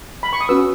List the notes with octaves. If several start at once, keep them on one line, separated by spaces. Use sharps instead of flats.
B5
C#6
D#6
C#4 F#4 B4 E6